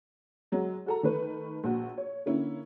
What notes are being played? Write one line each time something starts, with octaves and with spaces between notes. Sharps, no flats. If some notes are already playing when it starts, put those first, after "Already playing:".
F#3 G#3
F#4 A4 A#5
D#3 A3 B4
A#1 F#4
C#5
D3 A#3 C#4 E4